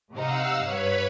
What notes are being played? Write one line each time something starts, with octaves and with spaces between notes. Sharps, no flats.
C3 D#4 F5 F#5 E6
G2 B4 C#5 B5